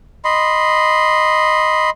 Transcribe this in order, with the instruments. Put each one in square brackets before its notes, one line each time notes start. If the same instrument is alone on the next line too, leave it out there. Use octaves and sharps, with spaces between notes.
[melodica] D#5 B5 C6